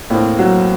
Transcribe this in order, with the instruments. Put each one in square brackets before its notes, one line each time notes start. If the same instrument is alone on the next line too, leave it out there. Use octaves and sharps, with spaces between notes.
[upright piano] A2 [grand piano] A#3 C4
[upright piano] F#3